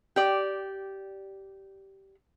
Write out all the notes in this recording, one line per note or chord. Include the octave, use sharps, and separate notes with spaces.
G4 D5